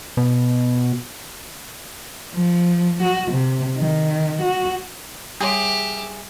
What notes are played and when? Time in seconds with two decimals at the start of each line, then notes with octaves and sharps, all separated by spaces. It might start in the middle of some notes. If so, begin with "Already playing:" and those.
0.17 B2
2.33 F3
3.02 F#4
3.31 C3
3.77 D#3
4.41 F#4
5.41 G3 G4 G#4 C#5 E5 C6